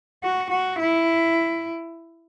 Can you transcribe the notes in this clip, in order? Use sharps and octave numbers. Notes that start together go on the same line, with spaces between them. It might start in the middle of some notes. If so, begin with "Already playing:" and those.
F#4
F#4
E4